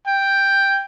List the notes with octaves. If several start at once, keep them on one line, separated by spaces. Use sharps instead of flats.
G5